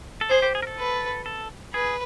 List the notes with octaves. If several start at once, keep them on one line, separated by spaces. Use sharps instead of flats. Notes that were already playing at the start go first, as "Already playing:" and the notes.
A4
G#4 C5
G4
G#4
A#4
A4
B4
A4
G#4 B4